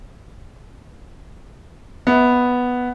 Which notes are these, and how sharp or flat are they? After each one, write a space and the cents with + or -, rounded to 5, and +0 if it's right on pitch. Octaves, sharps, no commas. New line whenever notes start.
B3 +0 E5 -30